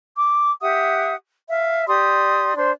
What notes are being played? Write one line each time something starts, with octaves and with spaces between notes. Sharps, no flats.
D6
G4 E5 F#5 D#6
E5 F5
G4 D5 C6 D#6
D4 C5 C6